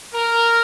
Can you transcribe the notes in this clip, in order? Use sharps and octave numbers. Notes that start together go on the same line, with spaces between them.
A#4